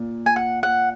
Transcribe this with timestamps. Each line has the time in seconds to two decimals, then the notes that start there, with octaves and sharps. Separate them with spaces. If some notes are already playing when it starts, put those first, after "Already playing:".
Already playing: A#2
0.26 G#5
0.36 F#5
0.63 F#5